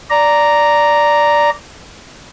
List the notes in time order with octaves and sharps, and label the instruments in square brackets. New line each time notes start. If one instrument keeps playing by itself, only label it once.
[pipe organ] D5 A#5